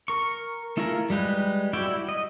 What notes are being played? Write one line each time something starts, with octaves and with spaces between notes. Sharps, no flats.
A#4 C#6
A3 E4 F4 G#4 A#4
G3 G#3 G4 B4
E4 F#4 G4 D5 G5
D#5